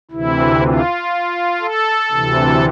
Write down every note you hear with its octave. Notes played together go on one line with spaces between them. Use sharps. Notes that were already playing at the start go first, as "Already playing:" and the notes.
D2 C3 E3 E4
F4
A4
D2 C3 E3